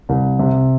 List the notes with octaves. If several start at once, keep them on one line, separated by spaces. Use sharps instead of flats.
C2
C3